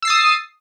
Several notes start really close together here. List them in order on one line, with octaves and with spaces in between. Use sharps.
E6 C7 A6 D#6